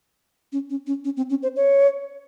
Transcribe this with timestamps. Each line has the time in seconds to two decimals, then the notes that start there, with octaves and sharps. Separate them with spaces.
0.52 C#4
0.70 C#4
0.87 C#4
1.05 C#4
1.17 C4
1.30 C#4
1.43 C5
1.56 C#5